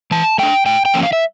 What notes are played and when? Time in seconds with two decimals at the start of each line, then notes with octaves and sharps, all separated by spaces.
0.11 E3 A5
0.38 A3 D4 G5
0.66 A2 G5
0.85 G5
0.94 F3 A#3 C#4
1.03 F5
1.13 E5